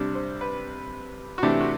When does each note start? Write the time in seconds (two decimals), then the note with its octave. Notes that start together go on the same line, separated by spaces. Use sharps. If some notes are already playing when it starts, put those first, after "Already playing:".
Already playing: C3 G3 D4
0.15 C5
0.41 B4
1.38 F#4
1.43 C3 E3 A3 D4 G4
1.61 F#4